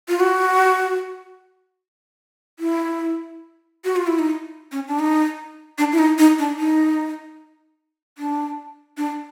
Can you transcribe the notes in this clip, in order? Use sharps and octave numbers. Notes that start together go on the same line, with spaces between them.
F4
F#4
E4
F#4
F4
E4
D#4
C#4
D4
D#4
D4
E4
D#4
D#4
D4
D#4
D4
D4